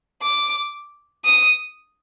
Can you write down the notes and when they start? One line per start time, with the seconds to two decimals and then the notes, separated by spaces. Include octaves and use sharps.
0.22 D6
1.24 D#6